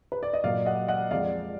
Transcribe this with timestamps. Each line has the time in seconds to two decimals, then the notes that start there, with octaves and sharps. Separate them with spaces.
0.12 B4
0.23 D5
0.34 D#5
0.44 A#2 F#3 A#3 D5 F5
0.66 D#5 F#5
0.88 D#5 F#5
1.11 F2 F3 G#3 D5 F5